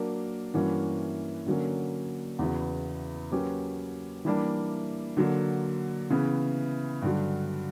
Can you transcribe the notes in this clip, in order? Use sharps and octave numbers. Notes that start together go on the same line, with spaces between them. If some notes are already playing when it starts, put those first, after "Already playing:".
Already playing: F#3 A#3 D4 A#4
G2 E3 A#3 C#4 F#4
D3 F#3 A#3 C#4
E2 C#3 E3 B3 F#4
F#3 A#3 C#4 G4 B4
E3 G3 A#3 D4
D3 F#3 A#3
C#3 E3 B3
G2 D3 F#3